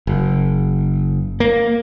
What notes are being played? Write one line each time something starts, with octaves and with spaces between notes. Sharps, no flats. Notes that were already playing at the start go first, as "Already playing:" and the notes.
F#1
A#3